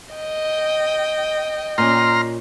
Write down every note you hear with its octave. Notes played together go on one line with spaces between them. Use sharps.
D#5 G5
A#2 C#4 A#5 C6 F6